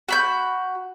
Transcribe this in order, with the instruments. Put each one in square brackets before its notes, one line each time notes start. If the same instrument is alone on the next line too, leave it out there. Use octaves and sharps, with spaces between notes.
[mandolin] F#4 B5 G6